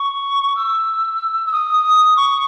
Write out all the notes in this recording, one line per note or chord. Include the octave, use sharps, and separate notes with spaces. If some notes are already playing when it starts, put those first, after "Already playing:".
Already playing: C#6
E6
E6
D#6
C#6